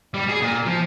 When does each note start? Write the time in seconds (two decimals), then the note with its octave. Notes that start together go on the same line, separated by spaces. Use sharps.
0.14 G3
0.29 G#4
0.41 A#2
0.66 F3